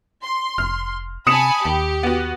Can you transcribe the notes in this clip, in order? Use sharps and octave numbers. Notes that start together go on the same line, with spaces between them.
C6
F1 F6
C3 G#5 A5 B5 D#6 C#7 E7
D#2 G4
B3 F#4